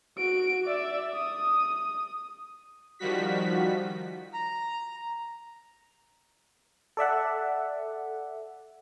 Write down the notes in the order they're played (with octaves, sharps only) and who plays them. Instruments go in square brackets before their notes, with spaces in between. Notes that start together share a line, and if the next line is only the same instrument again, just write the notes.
[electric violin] F#4 D7
D5 E5
D#6
[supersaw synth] D#3 F3 G3 F#4 B6
[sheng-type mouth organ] A#5
[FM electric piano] A4 D5 E5 F#5